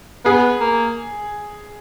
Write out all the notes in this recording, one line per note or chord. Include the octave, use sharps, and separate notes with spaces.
B3 G#4
A#3